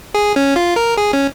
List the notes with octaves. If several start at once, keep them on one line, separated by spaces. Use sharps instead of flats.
G#4
C#4
F4
A#4
G#4
C#4